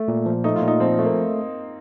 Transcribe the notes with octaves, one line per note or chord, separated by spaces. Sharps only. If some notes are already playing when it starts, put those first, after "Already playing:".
Already playing: A3
A#2
F3
A3 D#4
F4
A#2
D#4
F3 C4
A3
A#3